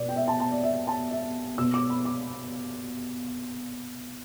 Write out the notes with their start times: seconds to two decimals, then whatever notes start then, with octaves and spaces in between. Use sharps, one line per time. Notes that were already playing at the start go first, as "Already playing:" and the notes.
Already playing: B2 B3 D5
0.09 G5
0.16 E5
0.28 A5
0.40 A5
0.52 D5
0.63 E5
0.87 A5
1.11 E5
1.58 B2 E6
1.62 B3
1.74 D6
1.90 B5
2.05 D6